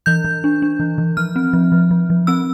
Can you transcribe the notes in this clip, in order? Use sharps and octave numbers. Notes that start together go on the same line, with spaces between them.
E3 G6
E3
D4
D4
E3
E3
F3 F6
C4
F3
F3
F3
F3
C4 E6